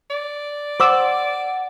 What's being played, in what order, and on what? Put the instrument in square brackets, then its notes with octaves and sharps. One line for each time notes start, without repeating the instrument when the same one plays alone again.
[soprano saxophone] D5
[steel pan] C5 D6 E6 [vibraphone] F#5